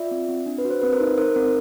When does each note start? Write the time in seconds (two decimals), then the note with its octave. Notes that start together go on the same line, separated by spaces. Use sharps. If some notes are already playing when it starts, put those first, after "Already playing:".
Already playing: F4 D5 E5
0.11 C4
0.28 C4
0.46 D4
0.58 B4
0.65 F#4
0.70 C5
0.82 C4 B4
0.92 A#4 C5
1.00 D#4
1.18 D#4 A#4 C5
1.36 C4 A#4